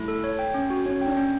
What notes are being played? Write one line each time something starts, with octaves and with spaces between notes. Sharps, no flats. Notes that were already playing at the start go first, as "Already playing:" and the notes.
Already playing: G3 A3 E4
A4
C#5
G5
C#4
F#4
C#4 C#5
D4 G5
C#4